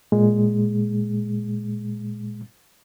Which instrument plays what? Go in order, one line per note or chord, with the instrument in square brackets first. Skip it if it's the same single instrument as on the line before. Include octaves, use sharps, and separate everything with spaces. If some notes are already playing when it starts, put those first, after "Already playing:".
[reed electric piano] A#2 G#3